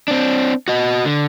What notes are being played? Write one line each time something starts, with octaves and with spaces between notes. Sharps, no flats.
C4 D4
F#4 D#5
D3